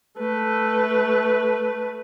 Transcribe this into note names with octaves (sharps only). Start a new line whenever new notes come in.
A3 B4